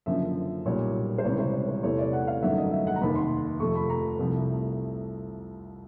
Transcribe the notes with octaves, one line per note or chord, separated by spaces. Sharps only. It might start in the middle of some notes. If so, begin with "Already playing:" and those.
F#1 F#2 D3 F3 E5
B1 A#2 G3 C#5
C5
C#2 C3 E3 G3 C#5
C5
C#5
C5
E2 C3 E3 A3 C#5
D5
F#5
F5
G1 F#2 D#3 F#3 A3 E5
D#5
E5
F#5
A#5
F1 D#2 D#3 B5
C6
F2 C3 F3 A3 C#6
B5
A#5
C2 C3 F3 A3